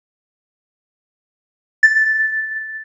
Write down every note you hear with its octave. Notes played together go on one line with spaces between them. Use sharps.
A6